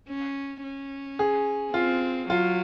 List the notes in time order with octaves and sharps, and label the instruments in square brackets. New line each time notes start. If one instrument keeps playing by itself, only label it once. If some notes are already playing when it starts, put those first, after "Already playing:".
[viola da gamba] C#4
C#4
[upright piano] G#4
[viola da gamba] C4 [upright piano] F4
[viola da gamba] F#3 [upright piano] F4